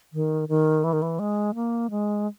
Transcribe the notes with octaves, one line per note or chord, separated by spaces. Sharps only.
D#3
D#3
E3
D#3
E3
G#3
A#3
G#3